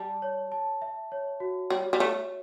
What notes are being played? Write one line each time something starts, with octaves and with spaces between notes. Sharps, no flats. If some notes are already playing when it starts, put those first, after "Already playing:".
Already playing: G3 A5
C#5
A5
E5
C#5
F#4
G3 C#5
G3
A3 C#5